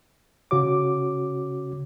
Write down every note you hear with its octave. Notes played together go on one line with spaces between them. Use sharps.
C#3 C#4 F#4 C#5 D6